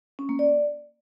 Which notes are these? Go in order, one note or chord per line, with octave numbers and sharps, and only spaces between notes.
C#4
A#3
D5